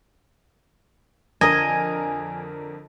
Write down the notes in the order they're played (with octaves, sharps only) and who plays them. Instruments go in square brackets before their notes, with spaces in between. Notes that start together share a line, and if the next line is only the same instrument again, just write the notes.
[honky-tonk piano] F2 D3 A#4 [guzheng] D#5 [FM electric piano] G#5